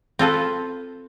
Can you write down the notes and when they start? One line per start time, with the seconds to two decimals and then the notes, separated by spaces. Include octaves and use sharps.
0.19 C4 F4 A4 B4